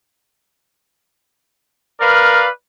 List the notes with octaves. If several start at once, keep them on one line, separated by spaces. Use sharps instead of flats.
A#4 B4 D5 F5